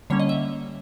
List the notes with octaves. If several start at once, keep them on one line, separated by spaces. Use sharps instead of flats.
D3 G3 A#3 C#4 C#5
D#5
E5